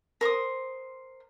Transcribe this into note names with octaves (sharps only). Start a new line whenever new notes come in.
A#4 C5 C6 D#6